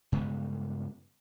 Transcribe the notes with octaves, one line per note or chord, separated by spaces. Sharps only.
G2 C#3 G#3 B3